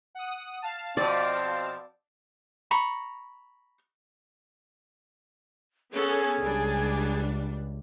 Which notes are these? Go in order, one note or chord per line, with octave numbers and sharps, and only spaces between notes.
F#5 D#6
F5 A5
B2 F3 C4 D5
A#5 B5 C#6
B3 C#4 G#4 A4
C#2 G3 D4